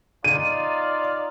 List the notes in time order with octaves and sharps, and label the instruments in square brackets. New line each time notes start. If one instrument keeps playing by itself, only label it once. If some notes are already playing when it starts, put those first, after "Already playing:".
[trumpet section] D#4 F4 D5 [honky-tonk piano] D#7